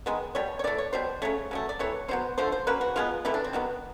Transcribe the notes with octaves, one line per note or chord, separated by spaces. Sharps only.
D#3 G#3 B3
B2 G3 C#5
C#5
E3 A3 D5
C#5
B2 G3 C5
C#3 F#3 A3 C#5
C#3 F#3 A3
D5
C3 E3 A3 C#5
D3 F#3 B3 C5
D3 F3 A3 C5
C5
C#3 F#3 A#3 B4
F#4
B2 G#3 B3 F4
C3 E3 A3 E4
D4
C4
D#3 F#3 B3